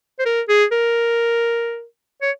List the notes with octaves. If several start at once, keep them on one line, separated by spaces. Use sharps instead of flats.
C5
A#4
G#4
A#4
C#5